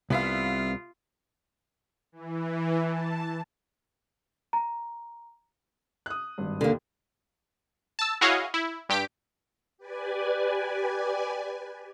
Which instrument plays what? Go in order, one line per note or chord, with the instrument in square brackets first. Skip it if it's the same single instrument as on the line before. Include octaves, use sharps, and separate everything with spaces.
[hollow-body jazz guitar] C2 [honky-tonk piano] B3 E5 F5 [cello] F4
[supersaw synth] E3
A5
[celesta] A#5
[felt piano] D#6 F#6
G#1 G2
[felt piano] D#2 [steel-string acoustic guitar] D3 A#3
[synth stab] A5 E6
E4 F#4 G#4 C#5 D#5 F5
E4
G2 G4 B6 D7
[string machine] G4 B4 D5 G#5